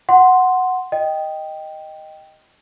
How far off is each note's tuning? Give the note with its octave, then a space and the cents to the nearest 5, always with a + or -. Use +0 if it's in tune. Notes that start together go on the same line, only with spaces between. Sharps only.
F#5 +0 C6 +0
D#5 +0 G5 +0